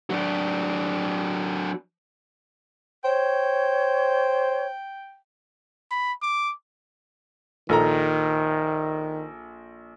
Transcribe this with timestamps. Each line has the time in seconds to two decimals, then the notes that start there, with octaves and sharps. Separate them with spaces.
0.10 F#3 D4
3.05 C5 C#5 G5
5.91 B5
6.22 D6
7.69 A#1 D#3 A4 A#5